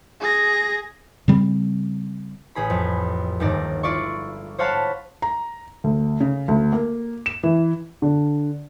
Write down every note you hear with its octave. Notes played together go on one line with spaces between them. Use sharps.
G#4 A#6
C#3 G3 A3 C4
A1 G#4 B5
F2
G1 D#2 G#2 D5 A#6
E4 F4 D5 C#6
C5 C#5 F5 F#5 A5 B5
A#5
D2
C#3
D2
A#3
E7
E3
D3